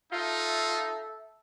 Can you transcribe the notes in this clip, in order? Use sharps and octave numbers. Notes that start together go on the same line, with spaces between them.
D#4 F4 A4 E5